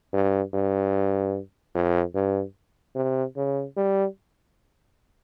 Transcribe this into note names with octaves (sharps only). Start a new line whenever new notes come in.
G2
G2
F2
G2
C3
C#3
G3